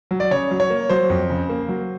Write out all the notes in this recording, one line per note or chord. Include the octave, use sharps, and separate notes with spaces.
F#3
D5
C#3 C#5
F#3
C#5
A#3
F#3 C5
F2
C#3
A#3
F#3